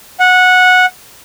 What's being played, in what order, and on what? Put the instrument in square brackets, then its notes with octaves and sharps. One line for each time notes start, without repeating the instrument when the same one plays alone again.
[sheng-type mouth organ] F#5